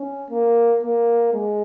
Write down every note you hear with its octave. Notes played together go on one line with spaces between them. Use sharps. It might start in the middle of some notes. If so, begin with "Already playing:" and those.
Already playing: C#4
A#3
A#3
G#3